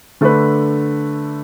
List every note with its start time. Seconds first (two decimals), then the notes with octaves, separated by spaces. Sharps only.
0.21 D3 A3 D4 B4